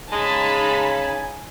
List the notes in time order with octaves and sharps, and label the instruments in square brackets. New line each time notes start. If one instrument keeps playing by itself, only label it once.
[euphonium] C#3 [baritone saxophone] G#3 [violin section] D#4 A5 B5 [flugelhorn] G#5